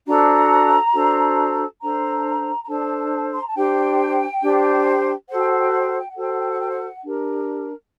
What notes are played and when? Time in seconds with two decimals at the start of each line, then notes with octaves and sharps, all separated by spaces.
0.07 D4 F#4 A4 C5 A#5
0.93 D4 F#4 A4 C5
1.80 D4 A4 C5 A#5
2.63 A#5
2.68 D4 A4 C5 A5
3.32 C6
3.40 A#5
3.47 A5
3.55 D4 G4 C5 G5
4.42 D4 G4 C5
5.29 F#4 A4 C5 F#5
5.39 G5
5.49 F#5
5.59 G5
5.69 F#5
5.79 G5
5.89 F#5
5.99 G5
6.09 F#5
6.16 F#4 A4 C5 G5
6.29 F#5
6.39 G5
6.49 F#5
6.59 G5
6.69 F#5
7.03 D4 G4 A#4